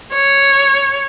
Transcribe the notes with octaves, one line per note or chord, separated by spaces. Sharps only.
C#5